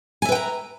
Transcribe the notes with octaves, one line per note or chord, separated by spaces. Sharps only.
B4 E5 G5 G#5 A#5